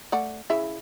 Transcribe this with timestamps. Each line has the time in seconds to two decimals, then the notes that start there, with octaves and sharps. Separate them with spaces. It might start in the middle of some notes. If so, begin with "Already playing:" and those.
0.12 A3 D5 F#5
0.50 C#3 E4 E5